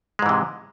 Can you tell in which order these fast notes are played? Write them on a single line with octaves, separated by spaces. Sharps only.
G#3 G#2 E3 C3